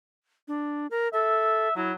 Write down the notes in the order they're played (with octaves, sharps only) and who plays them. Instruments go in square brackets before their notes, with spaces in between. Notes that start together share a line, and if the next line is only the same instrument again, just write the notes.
[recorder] D4
A#4
[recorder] A4 [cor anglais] E5
[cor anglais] F#3 [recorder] E4